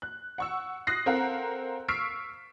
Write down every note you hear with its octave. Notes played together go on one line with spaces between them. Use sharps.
F#6
F#5 C#6 E6
D#6 F#6 A#6 C7
C4 A4 A#4 F5 F#5 A#5
C#6 E6 F6 B6 C7 D7